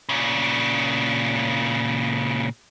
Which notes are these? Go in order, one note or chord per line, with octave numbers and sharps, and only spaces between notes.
A#2 C#3